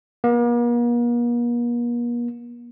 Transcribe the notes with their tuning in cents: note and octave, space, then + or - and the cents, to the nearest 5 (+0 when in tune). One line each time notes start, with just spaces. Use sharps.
A#3 +45